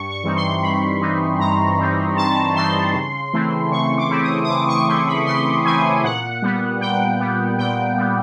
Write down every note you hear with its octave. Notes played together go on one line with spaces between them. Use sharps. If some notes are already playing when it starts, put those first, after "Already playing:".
Already playing: G2 C#6
C#6
E3 G3 C4 D#4
C6
G2 B5
E3 G3 C4 D#4
G2 A#5
E3 G3 C4 D#4
G2 A5
E3 G3 C4 D#4 C6
C#3
E3 A3 C4 E4
C#3 C#6
D6
E3 A3 C4 E4
D#6
D#6
C#3 D6
C#6
E3 A3 C4 E4 C6
B5
C#3 C6
E3 A3 C4 E4 G#5
A#2 F#5
G3 B3
A#2 G5
G3 B3
A#2 G5
G3 B3